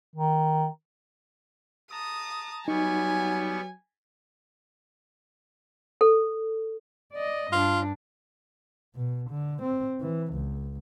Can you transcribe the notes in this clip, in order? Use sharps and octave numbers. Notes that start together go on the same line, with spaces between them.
D#3
A5 A#5 D#6
F#3 G3 B3 D#4 G#5 C#6
A4
D5 D#5
G2 D4 F4
B2
D3
C4
E3
C#2